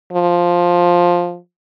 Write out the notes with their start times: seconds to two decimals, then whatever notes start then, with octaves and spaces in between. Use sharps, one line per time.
0.12 F3